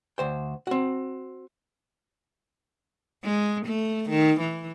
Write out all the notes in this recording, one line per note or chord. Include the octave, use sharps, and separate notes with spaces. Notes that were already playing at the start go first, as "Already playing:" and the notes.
D2 C5 G5
C4 F#4
G#3
A3
D#3
E3